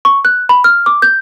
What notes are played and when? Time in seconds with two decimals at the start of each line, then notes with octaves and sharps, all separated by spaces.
0.05 C#6
0.25 F#6
0.49 B5
0.64 F6
0.86 D6
1.02 G6